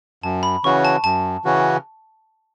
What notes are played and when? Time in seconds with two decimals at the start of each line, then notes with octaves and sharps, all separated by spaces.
0.23 F#2 A5
0.43 B5
0.64 C#3 E3 C#4 F#4 C#6
0.85 A5
1.04 F#2 A5
1.45 C#3 E3 C#4 F#4